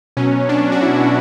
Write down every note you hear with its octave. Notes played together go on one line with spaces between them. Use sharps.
B2 F#3 C#4
D4
F#4
E4